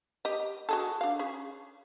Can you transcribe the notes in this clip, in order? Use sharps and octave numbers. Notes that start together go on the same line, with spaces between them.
G4 D#5
F#4 G#4 A4
D4 F5
C#4 G#4